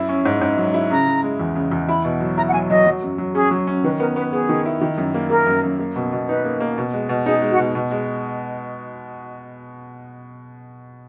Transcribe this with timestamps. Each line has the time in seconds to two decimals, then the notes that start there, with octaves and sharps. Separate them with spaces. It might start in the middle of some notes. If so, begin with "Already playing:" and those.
Already playing: F#2 E4
0.09 C#4
0.25 G#2
0.41 G#2
0.57 F#3
0.74 E4
0.90 C#3 A#5
1.07 C#3
1.23 G#3
1.39 E2
1.55 C#3
1.71 E2
1.88 E4 B5
2.05 B2
2.21 F#3
2.37 E4 A#5
2.48 F#5
2.53 F#3 G#5
2.70 F#3 D#5
2.86 F#3
3.03 F#2
3.18 F#3
3.34 C#4 G#4
3.51 F#3
3.67 C#4
3.84 D#3 B4
4.00 B3 A#4
4.16 B3 B4
4.32 B3 G#4
4.49 D#3
4.65 E4
4.81 D#3
4.98 F#2
5.14 A#3
5.30 A#3 A#4
5.47 F#2
5.63 F#2
5.79 A#3
5.96 B2
6.13 B2
6.28 D#4 B4
6.45 A#3
6.60 A#3
6.78 B2
6.93 G#3
7.09 B2
7.26 D#4 G#4
7.42 G#3
7.51 F#4
7.58 B2
7.75 B2
7.91 G#3